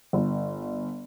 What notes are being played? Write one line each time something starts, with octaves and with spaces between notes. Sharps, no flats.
G1